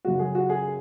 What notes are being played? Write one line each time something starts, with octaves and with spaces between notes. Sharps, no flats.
F#2 C#3 G#3 F#4
G#4
F#4
G#4